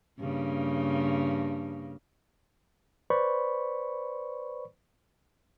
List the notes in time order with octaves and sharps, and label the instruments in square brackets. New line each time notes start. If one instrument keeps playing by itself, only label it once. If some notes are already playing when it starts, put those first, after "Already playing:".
[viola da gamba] G2 C#3 A#3
[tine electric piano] B4 C5 D5 B5 C#6